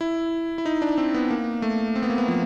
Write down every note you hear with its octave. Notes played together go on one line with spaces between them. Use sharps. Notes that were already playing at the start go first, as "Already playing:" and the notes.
E4
E4
D#4
D4
C4
B3
A#3
A3
C4
B3
A#3
B3
F3